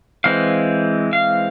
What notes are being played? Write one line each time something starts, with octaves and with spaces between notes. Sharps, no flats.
E3 G#3 C4 F5
F5